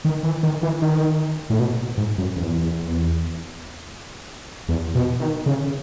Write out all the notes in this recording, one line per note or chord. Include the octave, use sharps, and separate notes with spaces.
D#3
E3
D#3
E3
D#3
A2
B2
G#2
F#2
E2
E2
B2
D#3
C#3